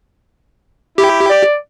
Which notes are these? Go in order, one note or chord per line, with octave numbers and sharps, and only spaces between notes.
E4 G4
D5